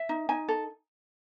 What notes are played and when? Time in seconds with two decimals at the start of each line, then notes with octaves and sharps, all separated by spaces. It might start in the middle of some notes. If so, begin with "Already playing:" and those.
Already playing: E5
0.09 D#4
0.29 D#4 G#5
0.48 A4